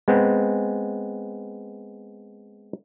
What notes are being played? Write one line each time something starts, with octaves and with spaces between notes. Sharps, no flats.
G#3 B3 C4